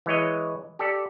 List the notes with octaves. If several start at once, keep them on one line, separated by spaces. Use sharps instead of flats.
E3 G#3 C#5 D#5
G4 A4 D5